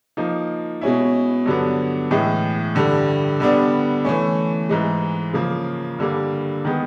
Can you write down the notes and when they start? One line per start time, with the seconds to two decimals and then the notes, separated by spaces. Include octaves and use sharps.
0.17 F3 A#3 D#4
0.81 B2 G#3 C#4 E4
1.46 G2 D3 F#3 B3
2.11 A2 E3 G#3
2.75 G2 D3 G3
3.40 D3 G3 B3 D4
4.05 E3 A3 C#4
4.69 G#2 E3 G#3
5.33 C#3 F3 A#3
5.99 G2 D3 G3 A#3
6.65 D#3 G#3 B3